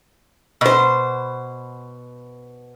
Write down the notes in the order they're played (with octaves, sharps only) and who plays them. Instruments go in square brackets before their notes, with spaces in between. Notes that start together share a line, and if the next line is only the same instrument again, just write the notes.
[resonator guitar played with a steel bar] B2 C5